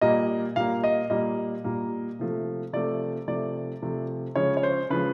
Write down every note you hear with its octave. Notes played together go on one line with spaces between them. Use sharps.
A#2 G3 A#3 D#5
A#2 G3 A#3 F5
D#5
A#2 G3 A#3 D#5
A#2 G3 A#3
C3 F3 A3
C3 F3 A3 D5
C3 F3 A3 D5
C3 F3 A3
C#3 F3 G#3 C#5
C#5
C5
C#3 F3 G#3 B4